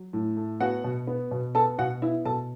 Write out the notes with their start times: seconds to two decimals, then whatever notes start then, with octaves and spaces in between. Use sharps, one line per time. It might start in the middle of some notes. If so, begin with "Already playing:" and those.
Already playing: F#3
0.13 A2
0.37 A3
0.60 B3 F#4 F#5
0.84 B2
1.07 B3
1.31 B2
1.55 B3 A4 A5
1.78 B2 F#4 F#5
2.02 B3 E4 E5
2.25 B2 A4 A5